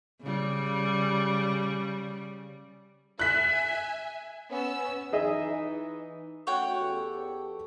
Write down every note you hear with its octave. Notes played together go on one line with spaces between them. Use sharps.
C#3 G3
E5 G#5 F#6 B6
B3 C#4 E6
E3 D#4 G#4 D#5 E5
A3 C#4 F#4 C#5 F#5 G5
E2 G4 A4